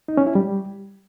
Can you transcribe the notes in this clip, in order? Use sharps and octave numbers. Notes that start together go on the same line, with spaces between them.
D#4
C#4
E4
G3